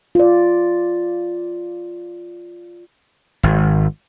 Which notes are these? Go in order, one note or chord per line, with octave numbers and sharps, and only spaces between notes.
F4 D5
G#1